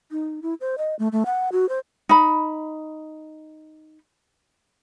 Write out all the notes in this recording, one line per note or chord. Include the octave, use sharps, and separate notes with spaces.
D#4
E4
C5
D#5
A3
A3
F#5
F#4
C5
D#4 B5